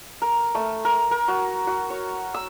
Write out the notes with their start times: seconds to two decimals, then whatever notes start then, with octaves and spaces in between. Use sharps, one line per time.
0.22 A#4
0.55 A3
0.85 A#4
1.11 A#4
1.28 F#4
1.67 F#4
1.90 C#5
2.34 E6